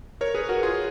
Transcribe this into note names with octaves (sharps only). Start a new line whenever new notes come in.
A#4 C#5
G#4 B4
F#4 A#4
F4 G#4